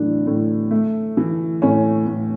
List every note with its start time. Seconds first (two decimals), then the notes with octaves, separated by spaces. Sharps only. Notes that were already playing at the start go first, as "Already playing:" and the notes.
Already playing: A2 E3 F#3 D4
0.27 A2
0.71 A3
1.17 E3
1.62 A2 C#4
2.07 A2